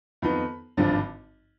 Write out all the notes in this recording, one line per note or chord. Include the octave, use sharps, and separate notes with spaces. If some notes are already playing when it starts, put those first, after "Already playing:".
F2 D#3 B3 D#4 B5
G#1 G2 D3 F3